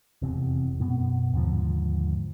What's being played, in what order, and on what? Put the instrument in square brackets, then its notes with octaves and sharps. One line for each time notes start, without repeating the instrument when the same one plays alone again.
[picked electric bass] F1 E2 C3
F#2 B2 B3
D#2 G#2 D3 F3